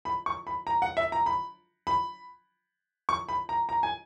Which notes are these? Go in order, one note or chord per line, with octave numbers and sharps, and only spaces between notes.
B5
C#6
B5
A#5
F#5
E5
A#5
B5
B5
C#6
B5
A#5
A#5
G#5